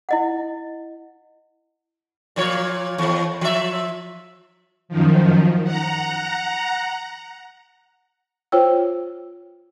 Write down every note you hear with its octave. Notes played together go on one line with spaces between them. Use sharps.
E4 D#5 F#5
A#2 F3 C#5
E2
F3 E5
F#2 D#3 F3
F#5 A#5
F4 C5 C#5 G5 E6